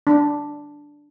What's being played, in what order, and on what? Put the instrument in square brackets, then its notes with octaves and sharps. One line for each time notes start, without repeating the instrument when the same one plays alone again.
[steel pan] D4